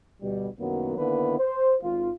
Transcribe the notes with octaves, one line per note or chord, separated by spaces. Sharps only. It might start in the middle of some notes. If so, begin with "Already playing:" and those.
D2 B2 G3
C2 F#2 D#3 F#3 A#3 B3
D3 D#3 A#3 B3 E4 B4
C5
G#1 F4